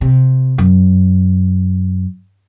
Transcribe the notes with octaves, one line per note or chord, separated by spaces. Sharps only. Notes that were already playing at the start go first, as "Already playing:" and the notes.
C3
F#2